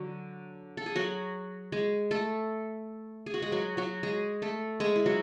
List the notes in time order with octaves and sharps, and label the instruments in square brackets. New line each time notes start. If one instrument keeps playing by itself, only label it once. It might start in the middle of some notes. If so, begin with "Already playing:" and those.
Already playing: [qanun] D3 F#3 F#4
A4
G#4
F#3 F#4
G#3 G#4
A3 A4
G#4
F#4
G#3 G#4
F#3 F#4
F#3 F#4
G#3 G#4
A3 A4
G#3 G#4
E4
F#3 F#4